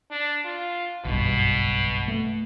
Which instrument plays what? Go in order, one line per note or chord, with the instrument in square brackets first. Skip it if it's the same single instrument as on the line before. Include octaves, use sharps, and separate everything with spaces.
[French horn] D4
F4
[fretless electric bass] F#1 B1 G2 [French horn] B2
[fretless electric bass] A3